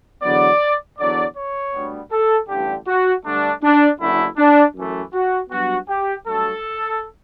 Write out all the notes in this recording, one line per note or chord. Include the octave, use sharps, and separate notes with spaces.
E2 D3 F#3 B3 D5
E2 D3 F#3 D5
C#5
D2 D3 G3 B3
A4
A1 G2 D3 G4
F#4
G2 D3 A3 D4
D4
F#1 F#2 D3 A3 E4
D4
F#2 E3 A3
F#4
G2 F#3 B3 F#4
G4
G2 F#3 A3 A4